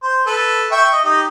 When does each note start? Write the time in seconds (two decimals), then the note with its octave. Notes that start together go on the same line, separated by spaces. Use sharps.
0.03 C5
0.27 A4 B4
0.72 E5 G5 C#6
0.93 D#5
1.05 D#4 G4